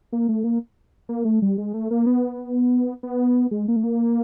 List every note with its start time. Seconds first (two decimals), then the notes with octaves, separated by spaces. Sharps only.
0.13 A#3
0.29 A3
0.44 A#3
1.09 A#3
1.25 A3
1.42 G3
1.58 G#3
1.74 A3
1.91 A#3
2.06 B3
3.03 B3
3.51 G#3
3.68 A#3
3.76 A3
3.84 A#3